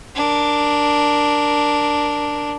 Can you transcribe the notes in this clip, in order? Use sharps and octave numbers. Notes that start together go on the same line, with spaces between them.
D4 A#4